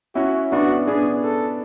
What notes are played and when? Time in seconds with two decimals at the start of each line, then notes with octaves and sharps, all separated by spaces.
0.15 C#4 E4 F#4
0.51 B3 D4 F#4
0.87 B3 D4 G#4
1.23 A4